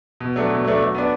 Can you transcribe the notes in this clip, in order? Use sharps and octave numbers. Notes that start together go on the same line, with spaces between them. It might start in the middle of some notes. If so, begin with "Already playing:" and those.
B2
F#3 A3 D4
B2
F#3 A3 D4
F#3
B3 D4